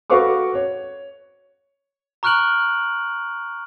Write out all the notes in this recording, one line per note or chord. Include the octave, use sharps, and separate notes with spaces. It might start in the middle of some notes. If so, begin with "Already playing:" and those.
F#4 A4 B4 F5 C#6 D6
C#5
A#5 C#6 F6 F#6 D7 F#7